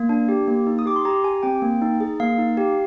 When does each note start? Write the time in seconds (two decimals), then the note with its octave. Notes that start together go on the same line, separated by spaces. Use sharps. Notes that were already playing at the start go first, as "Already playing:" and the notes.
Already playing: A#3
0.09 D4
0.29 G4
0.48 A#3
0.67 D#4
0.79 D#6
0.86 G4 D6
0.96 C6
1.05 G4 A#5
1.24 G4 G#5
1.43 C4 G5
1.62 A#3
1.81 D#4
2.00 G#4
2.20 A#3 F5
2.38 D#4
2.57 G4